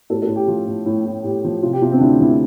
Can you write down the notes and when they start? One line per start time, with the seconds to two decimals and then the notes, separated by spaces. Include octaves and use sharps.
0.10 A2 A4
0.22 A4
0.28 A2
0.36 G4
0.48 F3 F4
0.67 A2
0.86 A2
1.06 A2
1.24 A2 G4
1.44 F3
1.62 C3 F4
1.73 G4
1.82 C3 F4
1.92 C4
1.97 D4
2.01 D2 E4
2.20 D2 E4